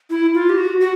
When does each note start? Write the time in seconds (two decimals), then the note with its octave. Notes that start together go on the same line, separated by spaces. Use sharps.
0.10 E4
0.34 F4
0.49 G4
0.58 F#4
0.81 F#4